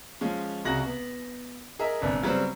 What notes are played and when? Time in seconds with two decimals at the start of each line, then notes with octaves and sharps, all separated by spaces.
0.21 F3 G#3 C#4
0.65 C2 C#3 F#4 A#5 A#6 F#7
0.85 B3
1.79 G#4 A#4 D#5 E5
2.01 G1 C3 D4 B4
2.22 C#3 F#3 G3 B3 C4